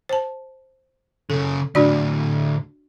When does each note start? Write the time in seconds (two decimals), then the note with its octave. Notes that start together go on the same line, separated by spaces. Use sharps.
0.09 C5 A5
1.30 F#2 C#3 A4
1.75 D2 A2 D4 F#4 D5